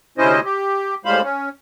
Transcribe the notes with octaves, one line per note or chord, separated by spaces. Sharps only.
D2 C3 C#4 E4 C5 D#5
G4
A2 G3 G#3 C5 F5 B5
C#4